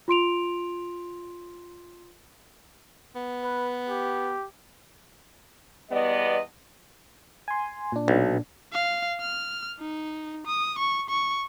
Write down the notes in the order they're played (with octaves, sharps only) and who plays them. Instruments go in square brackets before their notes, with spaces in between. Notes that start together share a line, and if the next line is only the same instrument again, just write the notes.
[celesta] F4 C6 D7 F7
[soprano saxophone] B3
[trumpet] B4
G4
[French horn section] E2 G3 B3 D5 D#5
[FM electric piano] G#5 C6
A#2 D4
[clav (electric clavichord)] B1
[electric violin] F5
F6
D#4
D#6
C#6
C#6